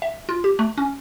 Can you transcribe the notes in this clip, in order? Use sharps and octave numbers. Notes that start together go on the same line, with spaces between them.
E5
F4
G4
A3
C#4